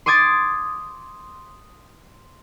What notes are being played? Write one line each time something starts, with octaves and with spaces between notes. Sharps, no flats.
C6 D6 D#6 G#6 A6